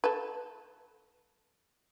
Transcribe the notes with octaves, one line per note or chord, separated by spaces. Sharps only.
A4 B4